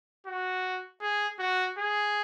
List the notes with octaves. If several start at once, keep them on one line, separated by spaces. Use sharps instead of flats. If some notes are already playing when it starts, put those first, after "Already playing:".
F#4
G#4
F#4
G#4